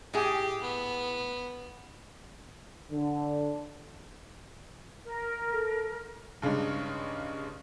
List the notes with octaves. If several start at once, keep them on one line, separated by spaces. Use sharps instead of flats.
A2 G4 G#4
B3
D3
A#4
A4
G2 C#3 G#3 D4 D#4